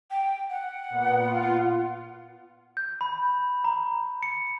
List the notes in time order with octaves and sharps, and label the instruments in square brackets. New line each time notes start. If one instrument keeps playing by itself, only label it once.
[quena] G5
F#5
[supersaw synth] A#2 B3
F4
[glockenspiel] G6
B5
A#5
C#7